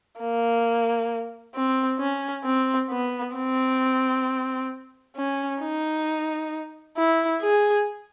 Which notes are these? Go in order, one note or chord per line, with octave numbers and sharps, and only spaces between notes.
A#3
C4
C#4
C4
B3
C4
C#4
D#4
E4
G#4